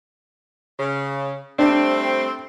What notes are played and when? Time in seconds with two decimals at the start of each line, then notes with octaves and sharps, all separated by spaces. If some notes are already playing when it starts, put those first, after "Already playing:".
0.79 C#3
1.59 G3 A3 C4 D4